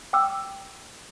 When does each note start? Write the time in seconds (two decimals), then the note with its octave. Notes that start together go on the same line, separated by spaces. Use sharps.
0.13 G5 D6 E6